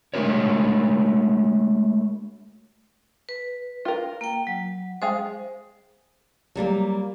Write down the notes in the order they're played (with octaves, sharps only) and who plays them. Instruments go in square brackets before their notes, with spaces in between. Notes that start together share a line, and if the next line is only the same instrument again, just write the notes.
[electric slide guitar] G#3 A3 D4 F#4 A#4 C#5
[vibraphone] B4
[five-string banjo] F4 A#4
[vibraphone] A#3 G5
F#3
[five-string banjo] G#3 G#4 F5 [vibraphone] C5
[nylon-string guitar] F#3 G3 A3 A#3